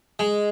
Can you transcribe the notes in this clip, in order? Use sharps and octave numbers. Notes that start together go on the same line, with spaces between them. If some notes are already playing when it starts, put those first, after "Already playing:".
G#3